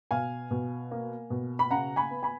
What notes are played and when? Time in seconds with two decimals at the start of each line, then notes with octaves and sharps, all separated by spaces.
0.11 B2 F5 G#5
0.51 B2
0.91 A#3
1.30 B2
1.59 B5
1.71 C#3 F#5 A#5
1.96 G#5 B5
2.11 B3
2.23 G#5 B5